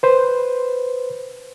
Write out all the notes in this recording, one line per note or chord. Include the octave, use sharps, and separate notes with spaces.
B4 C5